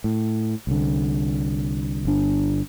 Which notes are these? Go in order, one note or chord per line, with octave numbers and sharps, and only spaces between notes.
A2
C2 D3
G1 D4